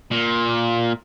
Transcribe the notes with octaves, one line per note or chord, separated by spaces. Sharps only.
A#2